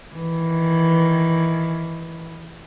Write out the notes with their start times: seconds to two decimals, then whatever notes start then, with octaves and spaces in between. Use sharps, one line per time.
0.10 D#3 E3